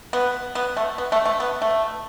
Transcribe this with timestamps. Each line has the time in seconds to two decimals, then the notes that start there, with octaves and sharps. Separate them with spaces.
0.13 B3
0.55 B3
0.77 A3
0.98 B3
1.12 A3
1.25 A3
1.40 B3
1.62 A3